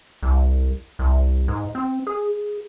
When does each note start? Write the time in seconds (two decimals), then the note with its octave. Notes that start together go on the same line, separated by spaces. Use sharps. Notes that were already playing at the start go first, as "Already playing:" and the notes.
0.23 C2
0.99 C2
1.48 G#2
1.75 C4
2.07 G#4